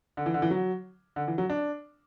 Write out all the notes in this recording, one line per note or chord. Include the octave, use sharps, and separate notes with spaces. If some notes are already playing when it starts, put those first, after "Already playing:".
D3
E3
D3
E3
F#3
D3
E3
F#3
D4